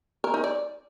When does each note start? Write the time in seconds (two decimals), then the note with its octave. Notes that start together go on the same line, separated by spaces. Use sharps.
0.24 A#4
0.34 D#4
0.44 D5